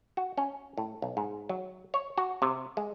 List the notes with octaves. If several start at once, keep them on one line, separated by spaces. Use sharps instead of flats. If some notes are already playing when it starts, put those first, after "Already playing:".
F#4
C#4
A2
B1
G#2
F#3
C#5
F#4
C3
G#3